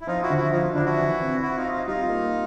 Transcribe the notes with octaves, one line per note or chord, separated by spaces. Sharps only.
E4
F3 D#4 F4
E4 F#4
D3
E4 F#4
F3 D#4 F4
D3 D4 E4
E4 F#4
E3
C4
C4 E4 F#4
D#4 F4
C4
D#4 F4
G3 D#4 F4
A#3